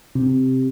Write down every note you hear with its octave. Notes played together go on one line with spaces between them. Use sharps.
C3